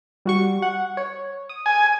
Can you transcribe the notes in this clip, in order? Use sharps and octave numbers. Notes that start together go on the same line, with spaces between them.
G3 F#4 C#6
F#5
C#5
D#6
G#5